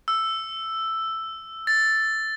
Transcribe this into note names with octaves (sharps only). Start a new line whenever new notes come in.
E6
A6